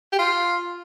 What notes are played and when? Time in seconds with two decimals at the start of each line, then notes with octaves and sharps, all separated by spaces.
0.12 G4
0.19 F4